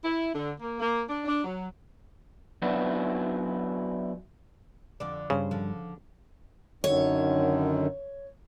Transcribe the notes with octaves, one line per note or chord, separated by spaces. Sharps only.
E4
D3
A#3
A#3
D4
D4
F#3
F#3 B3 D4 E4 F#4
F2 D3 D5
G2 C#3 C5
D3 F3
F#2 D3 D#3 C#5